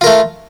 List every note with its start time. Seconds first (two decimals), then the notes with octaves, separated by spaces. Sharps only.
0.01 F4
0.04 A#4
0.06 A3